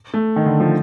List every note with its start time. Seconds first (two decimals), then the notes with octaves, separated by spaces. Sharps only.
0.14 A3
0.36 D#3
0.46 D3
0.60 F3